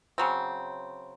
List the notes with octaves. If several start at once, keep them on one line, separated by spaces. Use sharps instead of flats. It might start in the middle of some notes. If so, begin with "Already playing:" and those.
C#3 F#3 C4